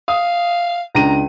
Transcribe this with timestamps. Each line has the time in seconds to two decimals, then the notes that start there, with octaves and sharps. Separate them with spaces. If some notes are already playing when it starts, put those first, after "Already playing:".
0.08 F5 D#6
0.95 C#2 D4 A#5 D#7